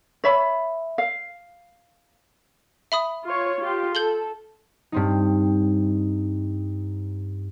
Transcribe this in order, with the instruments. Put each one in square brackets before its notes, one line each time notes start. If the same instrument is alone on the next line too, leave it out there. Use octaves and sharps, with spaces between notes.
[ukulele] C#5 E5 B5
F5
[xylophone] E5 B5 D#6
[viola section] F4 C#5
F4 G4
[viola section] A4 [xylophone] G6 F#7 G7
[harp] G2 C4 D#4